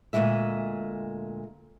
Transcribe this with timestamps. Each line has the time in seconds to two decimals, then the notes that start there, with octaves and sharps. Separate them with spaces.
0.13 D2 A#2 E3 F#3 G#3 E5